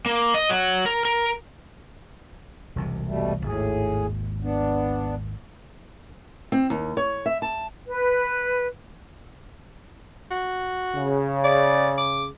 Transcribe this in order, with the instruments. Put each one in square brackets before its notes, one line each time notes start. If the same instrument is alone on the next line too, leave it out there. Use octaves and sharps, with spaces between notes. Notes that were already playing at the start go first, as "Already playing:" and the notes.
[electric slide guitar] A#3
D#5
F#3
A#4
A#4
[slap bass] E1 C2 C3
[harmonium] B2 G3 A3
[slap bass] G#1 D#2 [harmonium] A2 G#4
[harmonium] B3 D4
[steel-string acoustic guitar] C4
D#2
C#5
E5
A5
[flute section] B4
[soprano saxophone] F#4
[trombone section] C#3
[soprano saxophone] D5
D6